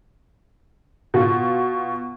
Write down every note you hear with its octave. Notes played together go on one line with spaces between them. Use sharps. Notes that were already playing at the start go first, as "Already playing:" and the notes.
B2 F4